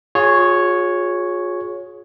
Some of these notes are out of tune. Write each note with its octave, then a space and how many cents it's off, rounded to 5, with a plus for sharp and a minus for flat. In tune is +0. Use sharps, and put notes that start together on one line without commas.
F4 +40 G#4 +0 C#5 +0